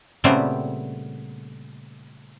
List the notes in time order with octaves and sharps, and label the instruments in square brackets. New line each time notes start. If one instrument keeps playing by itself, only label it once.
[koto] A#2 C#3 G3 A3 B3 C4